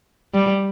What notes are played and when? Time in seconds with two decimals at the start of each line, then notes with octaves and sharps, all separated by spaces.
0.34 G3